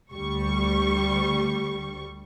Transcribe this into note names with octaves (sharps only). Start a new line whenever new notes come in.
D2 G3 C#6